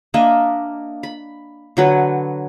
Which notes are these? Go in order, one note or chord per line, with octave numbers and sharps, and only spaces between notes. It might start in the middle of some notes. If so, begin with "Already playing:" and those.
A#3 D4 D#5 E5
B5
D3 F#3 B4